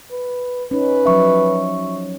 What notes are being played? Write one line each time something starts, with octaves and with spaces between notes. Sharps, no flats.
B4
C#4 D#4 B4
F3 F#3 C#4 E5 C#6